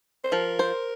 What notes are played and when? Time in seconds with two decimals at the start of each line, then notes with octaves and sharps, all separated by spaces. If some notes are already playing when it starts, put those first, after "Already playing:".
0.24 C5
0.32 F3 A#4
0.59 C5